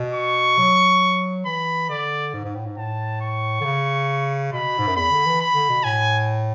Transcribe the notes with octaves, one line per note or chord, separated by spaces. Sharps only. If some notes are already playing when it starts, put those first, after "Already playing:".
Already playing: B2
C#6
F#3
E3 B5
D3 D5
G#2
G#2
A2
G#2
A2 A5
C#6
D3
C#3
B2 B5
G#2
F#2
E2 B5
D3
E3
B5
D3
B2
A2 G#5